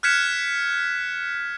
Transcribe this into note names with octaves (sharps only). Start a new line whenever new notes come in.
F6 F#6 G#6 B6 C#7 E7